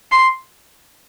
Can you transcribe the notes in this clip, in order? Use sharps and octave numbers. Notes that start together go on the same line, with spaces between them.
C6